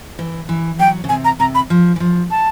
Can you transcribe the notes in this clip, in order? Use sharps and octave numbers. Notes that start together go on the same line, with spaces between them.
E3
E3
F#3 G5
C#3
C3 G#5
A#5
C3 A#5
B5
F3
E3
F3
A5